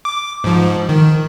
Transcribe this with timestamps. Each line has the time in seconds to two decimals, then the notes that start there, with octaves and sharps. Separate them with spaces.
0.05 D6
0.44 G#2 F3
0.89 D#3